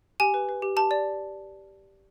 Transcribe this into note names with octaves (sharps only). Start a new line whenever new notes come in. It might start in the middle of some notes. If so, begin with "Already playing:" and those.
G4 G#5
B4
B4
G4
G4 A5
D5